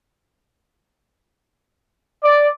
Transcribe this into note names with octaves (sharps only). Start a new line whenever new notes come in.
D5